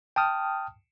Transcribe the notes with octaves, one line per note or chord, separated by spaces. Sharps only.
G5 A5 D#6 F6